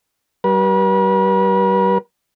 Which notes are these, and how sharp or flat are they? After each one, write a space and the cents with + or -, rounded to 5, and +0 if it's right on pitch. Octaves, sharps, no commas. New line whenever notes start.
G3 -35 B4 -45